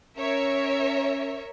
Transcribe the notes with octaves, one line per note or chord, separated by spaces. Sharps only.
C#4 A#4 C#5 E5